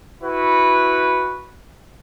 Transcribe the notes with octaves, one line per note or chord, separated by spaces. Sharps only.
E4 F#4 B4